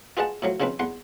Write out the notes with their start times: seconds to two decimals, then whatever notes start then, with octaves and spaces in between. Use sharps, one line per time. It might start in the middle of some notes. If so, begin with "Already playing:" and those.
0.17 F4 G#4 B4 D#5 F#5 A5
0.42 A2 F3 F#3
0.60 C#3 F3 C4 D#4 B4
0.79 E2 F#5 C6